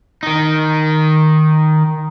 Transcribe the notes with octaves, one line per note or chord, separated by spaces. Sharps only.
D#3 D#4